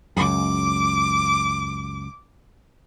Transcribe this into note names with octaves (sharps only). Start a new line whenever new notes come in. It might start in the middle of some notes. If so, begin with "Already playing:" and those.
C#2 F#2 D6